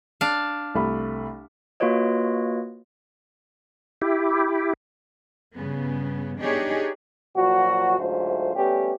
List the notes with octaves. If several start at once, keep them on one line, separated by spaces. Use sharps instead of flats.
D4 F5
C2 A3 B5
A#3 F4 F#4 B4 C#5 D#5
E4 G4
G2 C#3 B3
B3 D4 D#4 G4 G#4 C#5
A#2 F3 F#3 F#4
D2 G#2 F#3 A3 F4 C5
G3 A3 B3 C#4 G4